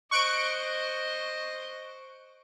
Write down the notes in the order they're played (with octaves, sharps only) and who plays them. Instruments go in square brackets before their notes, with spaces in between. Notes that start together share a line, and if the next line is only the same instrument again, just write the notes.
[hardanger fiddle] C5 D#5 [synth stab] C#6 F#6 D7